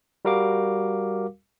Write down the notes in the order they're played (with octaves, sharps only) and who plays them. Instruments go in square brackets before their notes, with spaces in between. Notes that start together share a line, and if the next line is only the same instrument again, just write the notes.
[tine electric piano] G3 F#4 A#4 F5 D6